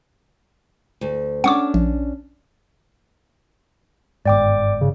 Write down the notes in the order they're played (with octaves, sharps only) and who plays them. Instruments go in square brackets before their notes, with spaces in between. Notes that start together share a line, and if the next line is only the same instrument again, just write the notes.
[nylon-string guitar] D2
[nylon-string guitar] C#4 D4 [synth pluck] F#5 C#6 D6
[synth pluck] A#1
[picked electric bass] G1 G#2 [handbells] D5 G5 D6
[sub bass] C#3